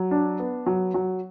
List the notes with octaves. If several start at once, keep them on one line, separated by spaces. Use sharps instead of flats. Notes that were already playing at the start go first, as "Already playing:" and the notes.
Already playing: F#3
D4
B3
F#3
F#3